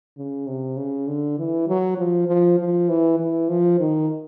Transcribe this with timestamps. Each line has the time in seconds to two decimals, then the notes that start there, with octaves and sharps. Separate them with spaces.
0.17 C#3
0.47 C3
0.77 C#3
1.07 D3
1.38 E3
1.68 F#3
1.98 F3
2.28 F3
2.59 F3
2.89 E3
3.19 E3
3.49 F3
3.80 D#3